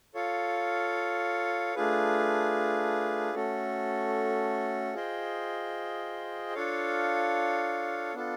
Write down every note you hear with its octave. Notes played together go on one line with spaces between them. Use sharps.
F4 A4 C#5 F5
A3 D4 F4 G#4 B4
A3 C#4 F#4 A4
F4 G#4 C5 D#5 G5
D4 F4 A4 C#5 F5
B3 D4 F4 A4